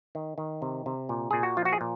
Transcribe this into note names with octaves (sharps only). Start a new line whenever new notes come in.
D#3
D#3
C3
C3
A#2
A#2 G#4
F#4
F3 F4
F#4
G#4
A#2